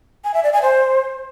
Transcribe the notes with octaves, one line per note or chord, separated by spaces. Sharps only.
G#5
E5
D5
G#5
C5